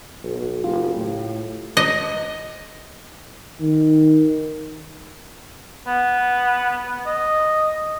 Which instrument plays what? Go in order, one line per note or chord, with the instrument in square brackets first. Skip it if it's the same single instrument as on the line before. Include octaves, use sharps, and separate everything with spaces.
[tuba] B1
[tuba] F#1 [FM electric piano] F4 G4
[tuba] A2
[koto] D#5
[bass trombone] D#3
[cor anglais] B3
D#5